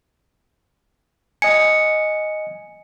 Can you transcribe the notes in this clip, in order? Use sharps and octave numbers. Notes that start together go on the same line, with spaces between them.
D#5 G#5 C#7